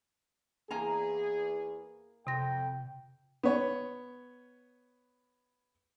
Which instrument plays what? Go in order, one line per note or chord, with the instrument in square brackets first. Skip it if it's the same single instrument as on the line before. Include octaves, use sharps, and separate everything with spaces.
[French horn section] E2 G#4 [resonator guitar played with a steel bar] A#3 G#5 A#5
[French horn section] F2 [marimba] C3 C6 A#6 [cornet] G5
[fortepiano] B3 C#5